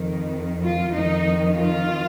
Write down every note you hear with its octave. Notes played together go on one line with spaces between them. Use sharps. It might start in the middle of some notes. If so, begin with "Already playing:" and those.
Already playing: F2 D#3
F4
F2 D#3 D#4
F4